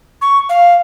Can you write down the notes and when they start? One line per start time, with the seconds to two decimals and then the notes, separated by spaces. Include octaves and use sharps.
0.21 C#6
0.49 F5